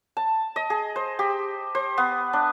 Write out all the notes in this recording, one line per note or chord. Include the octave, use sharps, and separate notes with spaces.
A5
D#5
G#4
C5
G4
C5
B3
D4